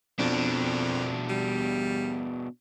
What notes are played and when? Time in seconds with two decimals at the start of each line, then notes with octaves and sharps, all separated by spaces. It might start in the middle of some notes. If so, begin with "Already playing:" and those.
0.19 F2 B2 D4
1.29 G3